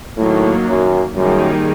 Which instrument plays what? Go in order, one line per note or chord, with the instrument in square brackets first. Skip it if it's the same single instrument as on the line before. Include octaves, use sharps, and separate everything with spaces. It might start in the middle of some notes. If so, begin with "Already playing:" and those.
[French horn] A2 [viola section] D#3 F#3 A#3
[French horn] F#2
[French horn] F#2 [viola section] D#3 G3 A#3 D#4 G#4